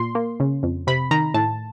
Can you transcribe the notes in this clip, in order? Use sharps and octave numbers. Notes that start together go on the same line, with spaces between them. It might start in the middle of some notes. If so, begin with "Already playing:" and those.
Already playing: A#2 C6
A#3
C#3
F2
C3 B5
D#3 A#5
A2 A5